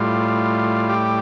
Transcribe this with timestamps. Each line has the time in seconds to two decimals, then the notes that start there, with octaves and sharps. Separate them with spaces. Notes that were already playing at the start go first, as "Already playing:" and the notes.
Already playing: A2 G3 F4
0.89 G4